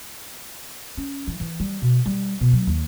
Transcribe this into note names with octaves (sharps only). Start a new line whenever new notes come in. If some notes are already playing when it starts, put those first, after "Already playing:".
C#4
E3
E3
G3
B2
G3
B2
F#3
D#2